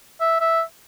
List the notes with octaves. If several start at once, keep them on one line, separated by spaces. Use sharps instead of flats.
E5
E5